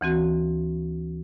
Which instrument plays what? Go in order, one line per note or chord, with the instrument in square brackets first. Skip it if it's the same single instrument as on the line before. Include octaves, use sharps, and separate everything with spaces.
[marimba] D2 E3 C4 F#4